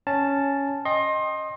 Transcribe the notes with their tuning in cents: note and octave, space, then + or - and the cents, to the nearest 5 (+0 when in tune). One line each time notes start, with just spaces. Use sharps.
C#4 +0 A5 +0
D#5 +0 G5 +0 C6 +25